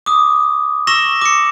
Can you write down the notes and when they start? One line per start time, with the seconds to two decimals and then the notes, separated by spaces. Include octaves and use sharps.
0.06 D6 D#6
0.87 C#6 E6 A#6 E7 F#7
1.21 D6 C#7